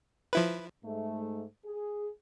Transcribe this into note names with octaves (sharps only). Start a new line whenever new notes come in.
F3 E4 B4
G#2 A3
G#4